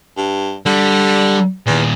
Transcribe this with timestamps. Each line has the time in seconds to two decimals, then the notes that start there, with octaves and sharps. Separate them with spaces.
0.17 G2
0.66 D3 G3
1.67 E2 A#2 D#3